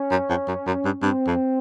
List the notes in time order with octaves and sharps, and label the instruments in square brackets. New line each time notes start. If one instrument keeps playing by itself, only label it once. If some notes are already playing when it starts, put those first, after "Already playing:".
Already playing: [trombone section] C#4
[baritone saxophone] F#2
F2
F#2
F#2
G2
[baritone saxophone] G2 [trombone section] C4
[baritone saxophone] F2